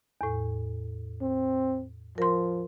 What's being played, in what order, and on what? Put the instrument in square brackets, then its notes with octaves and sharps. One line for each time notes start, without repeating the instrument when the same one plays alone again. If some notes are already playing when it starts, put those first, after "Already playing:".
[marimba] E2 A2
[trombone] C4
[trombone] F3 [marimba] A#4 C6